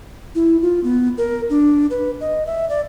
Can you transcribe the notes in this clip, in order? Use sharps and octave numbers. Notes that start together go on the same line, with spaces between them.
E4
F4
B3
A#4
D4
B4
D#5
E5
D5